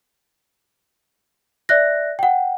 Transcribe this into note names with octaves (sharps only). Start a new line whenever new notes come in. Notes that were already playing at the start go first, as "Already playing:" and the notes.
D5 E5 F#6 A#6
F#5 G5